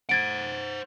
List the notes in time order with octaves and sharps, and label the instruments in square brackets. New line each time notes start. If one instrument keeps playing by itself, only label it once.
[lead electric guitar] C5 F#5 [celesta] G#6 A6 D7